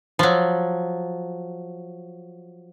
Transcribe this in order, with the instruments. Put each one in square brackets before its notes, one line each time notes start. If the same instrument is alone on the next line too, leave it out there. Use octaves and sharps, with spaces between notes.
[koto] F3 F#3